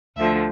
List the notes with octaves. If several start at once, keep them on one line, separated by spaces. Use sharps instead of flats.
D2 D3 F3 E5